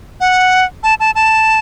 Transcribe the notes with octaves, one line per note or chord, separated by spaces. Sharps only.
F#5
A5
A5
A5